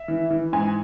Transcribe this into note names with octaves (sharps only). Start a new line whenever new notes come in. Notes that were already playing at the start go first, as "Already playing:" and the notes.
Already playing: E5
E3
E3
G#2 G#5